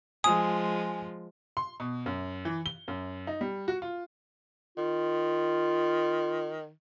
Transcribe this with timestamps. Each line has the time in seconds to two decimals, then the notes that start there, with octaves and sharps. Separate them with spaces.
0.24 F3 G#3 G#5 D#6
1.57 C6
1.80 B2
2.06 F#2
2.45 E3
2.66 G7
2.88 F#2
3.27 D#4
3.41 G3
3.68 F#4
3.82 F4
4.78 D#3 F4